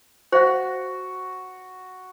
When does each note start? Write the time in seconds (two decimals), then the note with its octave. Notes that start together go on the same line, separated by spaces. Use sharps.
0.32 F#4 C5 F5